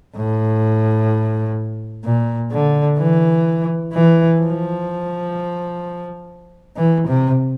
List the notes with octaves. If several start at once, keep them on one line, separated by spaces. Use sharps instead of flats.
A2
A#2
D3
E3
E3
F3
E3
C3